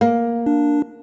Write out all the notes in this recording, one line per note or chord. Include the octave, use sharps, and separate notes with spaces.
A#3
D4